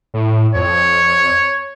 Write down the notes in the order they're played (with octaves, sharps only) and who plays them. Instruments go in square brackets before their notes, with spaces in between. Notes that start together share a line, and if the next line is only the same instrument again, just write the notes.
[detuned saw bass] A2
[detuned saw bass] F2 [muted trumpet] C#5